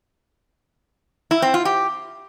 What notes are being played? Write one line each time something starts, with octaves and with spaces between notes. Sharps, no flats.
E4
C4
F4
G4